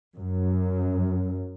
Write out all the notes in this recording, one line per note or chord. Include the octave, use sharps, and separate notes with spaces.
F#2